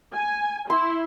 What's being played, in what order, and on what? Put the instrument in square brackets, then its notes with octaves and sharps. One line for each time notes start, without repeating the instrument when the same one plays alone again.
[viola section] G#5
[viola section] E4 [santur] C6